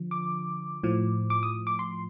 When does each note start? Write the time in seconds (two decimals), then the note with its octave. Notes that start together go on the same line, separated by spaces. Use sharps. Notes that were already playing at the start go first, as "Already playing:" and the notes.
Already playing: D3 F3
0.11 D6
0.83 A2 F3
1.30 D6
1.43 D#6
1.67 D6
1.79 C6